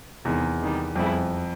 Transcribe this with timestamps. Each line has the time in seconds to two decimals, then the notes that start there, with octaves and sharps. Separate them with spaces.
0.25 E2 C3 D#3 G#3
0.61 C3 D#3 G3
0.95 F2 G3 B3 E4 G#4